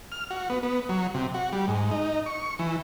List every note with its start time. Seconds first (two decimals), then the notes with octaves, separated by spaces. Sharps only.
0.12 F6
0.31 F#4
0.50 B3
0.63 B3
0.89 F#3
1.14 C3
1.34 F#4
1.53 G3
1.68 G#2
1.91 D#4
2.26 C#6
2.59 E3